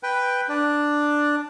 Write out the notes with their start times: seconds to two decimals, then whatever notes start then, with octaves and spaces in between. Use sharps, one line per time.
0.03 B4 G5
0.49 D4